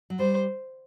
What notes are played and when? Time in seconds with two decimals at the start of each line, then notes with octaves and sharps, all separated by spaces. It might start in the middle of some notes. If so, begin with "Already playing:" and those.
0.10 F#3
0.19 G3 C5